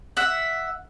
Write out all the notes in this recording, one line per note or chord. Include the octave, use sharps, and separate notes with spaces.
E5 F#5